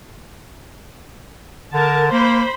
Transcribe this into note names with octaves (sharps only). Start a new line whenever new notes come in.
D3 A#4 A5
A#3 C5 B5